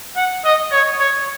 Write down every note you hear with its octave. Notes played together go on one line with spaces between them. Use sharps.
F#5
D#5
C#5
C#5